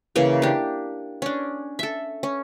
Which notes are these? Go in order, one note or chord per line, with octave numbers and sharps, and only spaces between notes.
C#3 E3 A#3 A#4
D4 G4
C#4 D4
A4 E5
C#4